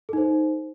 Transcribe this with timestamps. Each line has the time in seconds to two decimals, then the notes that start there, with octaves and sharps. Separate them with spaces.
0.09 A4
0.13 D#4
0.18 C5